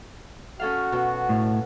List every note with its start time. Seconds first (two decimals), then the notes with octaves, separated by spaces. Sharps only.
0.60 C#4 F#4 A4 F5
0.92 B2
1.29 A2